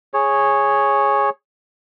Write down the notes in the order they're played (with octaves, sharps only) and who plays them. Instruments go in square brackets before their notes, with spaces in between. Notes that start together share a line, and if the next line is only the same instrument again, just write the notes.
[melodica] G#4 C#5